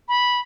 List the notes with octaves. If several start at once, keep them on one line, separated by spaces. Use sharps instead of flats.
B5